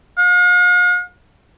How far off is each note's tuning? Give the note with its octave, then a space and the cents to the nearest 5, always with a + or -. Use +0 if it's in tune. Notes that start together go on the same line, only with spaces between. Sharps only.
F5 +45